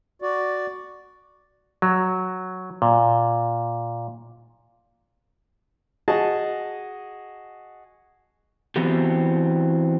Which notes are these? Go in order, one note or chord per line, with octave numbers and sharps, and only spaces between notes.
F#4 D5
F#3
A#2
F#4 G#4 D#5 A5
E3 B3 C4 F#4 G4